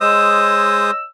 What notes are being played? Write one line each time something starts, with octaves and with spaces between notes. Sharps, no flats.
G#3 C5 C#5 D#5 D#6 E6